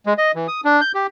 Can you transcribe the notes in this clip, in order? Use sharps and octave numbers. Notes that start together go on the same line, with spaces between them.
G#3
D#5
E3
D#6
D4
G6
G4